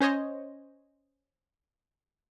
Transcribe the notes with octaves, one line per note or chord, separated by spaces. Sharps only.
C#4 C5 C#5 D#5